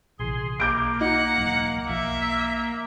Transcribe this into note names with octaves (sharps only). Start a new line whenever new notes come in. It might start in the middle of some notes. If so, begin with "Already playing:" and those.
A#1 C3 E3 G#4 C6
B1 A#3 D6 G6 D7
D#4 F#5
E1 C#2 F#3
B1 F3 A#3 E5